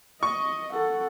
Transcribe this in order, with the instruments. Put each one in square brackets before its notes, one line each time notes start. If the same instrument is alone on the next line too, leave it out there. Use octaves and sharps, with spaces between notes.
[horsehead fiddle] D#5 [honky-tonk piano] C#6
[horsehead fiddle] A4 F#5